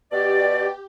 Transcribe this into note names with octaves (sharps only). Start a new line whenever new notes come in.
B2 G4 D5